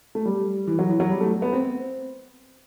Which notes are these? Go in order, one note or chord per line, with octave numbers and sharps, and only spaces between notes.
A3
G3
E3
F#3
E3
F#3
G3
A3
B3
C4